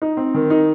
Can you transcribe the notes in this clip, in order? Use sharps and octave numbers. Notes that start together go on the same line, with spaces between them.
D#4
C4
D#3
D#4